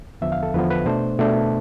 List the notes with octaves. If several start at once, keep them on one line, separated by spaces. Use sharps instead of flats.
E2 D3 F3 B3 E5
F5
A4
E2 D3 F3 B3 B4
B4
B2 A3 D4 C5
B2 A3 D4